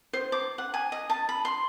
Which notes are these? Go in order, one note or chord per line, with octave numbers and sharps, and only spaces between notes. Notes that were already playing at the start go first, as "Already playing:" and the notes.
C5
D6
F#5
G#5
D#5
A5
B5
C6